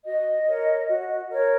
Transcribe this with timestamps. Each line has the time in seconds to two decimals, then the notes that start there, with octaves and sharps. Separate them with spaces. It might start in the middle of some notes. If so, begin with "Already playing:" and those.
0.04 F#4 D#5
0.47 A#4 C#5
0.88 F#4
1.28 A#4 C#5